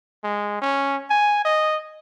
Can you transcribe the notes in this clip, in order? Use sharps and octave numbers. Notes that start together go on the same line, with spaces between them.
G#3
C#4
G#5
D#5